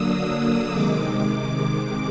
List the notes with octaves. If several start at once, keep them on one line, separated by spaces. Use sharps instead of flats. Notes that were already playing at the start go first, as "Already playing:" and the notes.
Already playing: D3 F#3 A#3 D4 D#6 E6
D#6
C3 D#3 G#3 D6